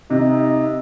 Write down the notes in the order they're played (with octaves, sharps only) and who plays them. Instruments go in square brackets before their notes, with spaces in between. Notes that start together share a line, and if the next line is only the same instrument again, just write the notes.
[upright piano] C3 [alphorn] D#4